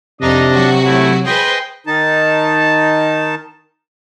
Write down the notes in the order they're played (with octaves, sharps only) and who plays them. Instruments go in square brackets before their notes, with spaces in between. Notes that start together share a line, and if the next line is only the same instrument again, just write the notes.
[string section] F2 D#4 [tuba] C3 [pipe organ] D4 D#5
[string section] F#3 F#4
[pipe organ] A3 E4
[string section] G#4 B4 C5 [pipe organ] D#5 G5 C6
[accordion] D#3 D#4 A5